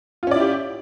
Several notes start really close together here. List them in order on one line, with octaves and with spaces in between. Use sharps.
F4 C#4 D5 E4 G4